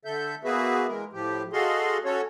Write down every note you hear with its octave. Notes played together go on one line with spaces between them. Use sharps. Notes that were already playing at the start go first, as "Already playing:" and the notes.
D3 A4 E5 G6
A#3 B3 F#4 G#4 B4 E5
E3 G#3 A#4
A2 F3 G4
F#4 G#4 A4 D#5 F5 C6
C#4 F#4 A4 C#5